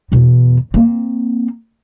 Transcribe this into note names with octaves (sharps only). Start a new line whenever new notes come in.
E2 B2
A#3 C4